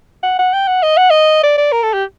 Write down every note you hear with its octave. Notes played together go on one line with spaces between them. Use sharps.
F#5
F#5
G5
F#5
D#5
F#5
D#5
D5
D5
A#4
A4
G4